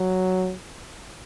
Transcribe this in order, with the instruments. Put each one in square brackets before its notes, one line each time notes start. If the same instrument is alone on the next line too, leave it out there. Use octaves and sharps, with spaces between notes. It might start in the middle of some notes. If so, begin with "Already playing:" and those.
Already playing: [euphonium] F#3